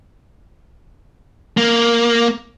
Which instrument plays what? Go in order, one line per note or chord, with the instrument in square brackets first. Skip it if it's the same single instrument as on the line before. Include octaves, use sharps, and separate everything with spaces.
[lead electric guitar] A#3